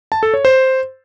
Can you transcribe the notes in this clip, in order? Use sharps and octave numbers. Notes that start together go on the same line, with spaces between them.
A5
A4
C#5
C5